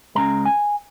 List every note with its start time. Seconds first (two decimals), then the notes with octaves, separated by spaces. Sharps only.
0.15 C#2 C#3 G#3 A#5
0.46 G#5